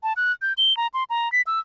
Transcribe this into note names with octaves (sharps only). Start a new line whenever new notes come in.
A5
F#6
G6
G7
A#5
C6
A#5
B6
E6